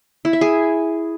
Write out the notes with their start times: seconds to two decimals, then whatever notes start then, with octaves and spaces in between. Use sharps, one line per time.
0.25 E4
0.33 E5
0.41 G#4